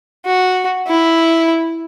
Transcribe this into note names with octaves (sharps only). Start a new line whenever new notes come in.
F#4
E4